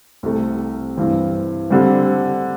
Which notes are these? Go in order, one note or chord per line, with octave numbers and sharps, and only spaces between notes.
C2 C3 A3
G2 E3 C4
D3 G3 C4